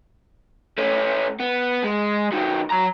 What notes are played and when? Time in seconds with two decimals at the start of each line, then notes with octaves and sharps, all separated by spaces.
0.78 A3 C#4
1.40 B3
1.84 G#3
2.32 D#3 F#3
2.71 F#3 A#5